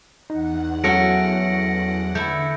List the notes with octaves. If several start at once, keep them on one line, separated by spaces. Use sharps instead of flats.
E2 D#4 F#5
F#3 A3 C#4 F#4 A4 A#6 C#7 D7
D3 A3 E4 G6